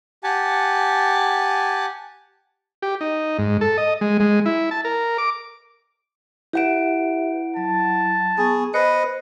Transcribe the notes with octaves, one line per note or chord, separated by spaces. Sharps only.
G4 F#5 G#5 A5
G4
D#4
G#2
A4
D#5
G#3
G#3
E4
A5
A#4
D6
E4 G4 B4 E5 F#5 D7
F#3 A5
B3 G#4 C#6
B4 C5 D#5 C#7